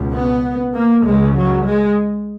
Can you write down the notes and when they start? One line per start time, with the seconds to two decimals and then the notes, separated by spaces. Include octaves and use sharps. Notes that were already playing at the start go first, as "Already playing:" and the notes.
Already playing: C#2 B2
0.15 B3
0.75 A#3
1.06 C#2 C#3 G#3
1.36 F#3
1.66 G#3